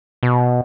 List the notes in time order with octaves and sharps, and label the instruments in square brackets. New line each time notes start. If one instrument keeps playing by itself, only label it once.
[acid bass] B2